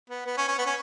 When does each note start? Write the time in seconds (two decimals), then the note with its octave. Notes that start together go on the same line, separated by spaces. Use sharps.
0.10 B3
0.26 B3
0.37 C#4
0.48 C#4
0.58 B3
0.66 C#4